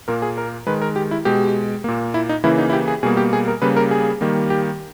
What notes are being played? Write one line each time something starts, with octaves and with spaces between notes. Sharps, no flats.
A#2 A#3 A#4
G#4
A#4
D#3 G#3 B4
A#4
G4
E4
B2 G#3 G4
A#2 A#3
E4
D#4
C#3 E3 A#3 E4
D#4
E4
G4
G#4
B2 G3 A#3 G#4
G4
G#4
A#4
C#3 G3 A#3 B4
A#4
G#4
D#3 G3 A#3
G4